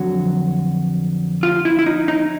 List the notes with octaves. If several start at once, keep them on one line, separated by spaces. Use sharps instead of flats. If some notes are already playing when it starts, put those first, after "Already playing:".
Already playing: F2 D3 F#3 F#4
F4
E4
E4
D#4
D#4